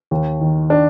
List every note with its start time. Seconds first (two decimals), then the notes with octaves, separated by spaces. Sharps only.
0.11 D#2
0.40 D#3
0.70 D4